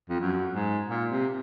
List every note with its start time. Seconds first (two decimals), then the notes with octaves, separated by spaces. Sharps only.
0.10 F2
0.21 F#2
0.55 G#2
0.88 A#2
1.11 C3